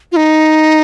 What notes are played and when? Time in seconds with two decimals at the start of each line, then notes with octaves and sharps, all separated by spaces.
0.12 F4
0.16 D#4